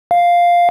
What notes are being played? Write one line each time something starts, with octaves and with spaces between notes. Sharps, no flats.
F5